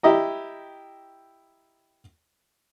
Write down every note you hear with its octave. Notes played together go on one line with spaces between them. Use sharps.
E4 G4 D#5 A#5